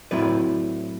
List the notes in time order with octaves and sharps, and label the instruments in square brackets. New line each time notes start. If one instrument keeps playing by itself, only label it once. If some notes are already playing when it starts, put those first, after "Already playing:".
[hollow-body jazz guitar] A2 F#3 C4 E4 B4 D5